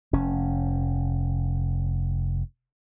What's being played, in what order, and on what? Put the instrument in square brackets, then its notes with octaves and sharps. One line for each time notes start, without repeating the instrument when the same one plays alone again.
[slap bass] F1 C#4